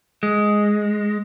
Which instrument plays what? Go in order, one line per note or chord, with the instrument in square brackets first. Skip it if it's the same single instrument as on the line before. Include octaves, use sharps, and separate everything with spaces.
[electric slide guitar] G#3